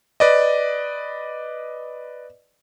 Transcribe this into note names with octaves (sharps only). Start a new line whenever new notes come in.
B4 D5 D#5